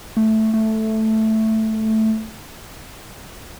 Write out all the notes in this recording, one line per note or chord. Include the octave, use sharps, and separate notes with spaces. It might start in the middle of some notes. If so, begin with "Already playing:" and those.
A3
A3